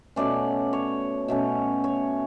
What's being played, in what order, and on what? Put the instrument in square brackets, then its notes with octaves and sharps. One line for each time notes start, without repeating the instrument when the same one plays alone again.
[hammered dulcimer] B2 A3 C#4 D5
C#5
B2 A3 C#4
C#5